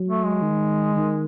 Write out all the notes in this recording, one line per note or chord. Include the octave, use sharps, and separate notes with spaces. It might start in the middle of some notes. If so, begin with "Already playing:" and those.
Already playing: F#3
A3
G#3
D#3
D#3